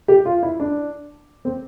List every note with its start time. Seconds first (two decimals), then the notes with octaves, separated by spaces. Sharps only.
0.08 G4
0.25 F4
0.43 E4
0.60 D4
1.45 C4